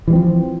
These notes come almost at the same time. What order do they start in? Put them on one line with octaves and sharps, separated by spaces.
E3 G3 C4 F3